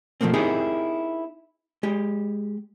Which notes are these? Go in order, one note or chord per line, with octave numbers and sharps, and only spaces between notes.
B2 F3 A3 A#3 C4
C4 D#4 E4 G4 G#4 A#4
G#3 G4